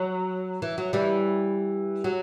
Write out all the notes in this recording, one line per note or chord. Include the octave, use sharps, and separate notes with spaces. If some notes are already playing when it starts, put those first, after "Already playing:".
Already playing: F#3
E3
F#3
E3 G3
F#3